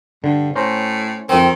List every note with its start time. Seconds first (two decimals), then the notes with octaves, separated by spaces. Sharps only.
0.24 G2 D3
0.56 A2 C#4 C5 A#5
1.29 F2 D#3 C4